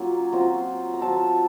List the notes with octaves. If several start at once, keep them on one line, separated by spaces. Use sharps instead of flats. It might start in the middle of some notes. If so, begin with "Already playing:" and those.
Already playing: F#3 A#3 C#4 F4
F#3 C4 F4 A#5
A#5
F#3 C4 F4 A5